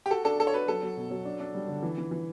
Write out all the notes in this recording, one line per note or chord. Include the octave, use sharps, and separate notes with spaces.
G4
F#4 A4
D4 A4
D4 A4
C#5
F#4 B4
F#3 A4
F#3
B2
F#3
D4
D4
G3
D3
E3
E3
E3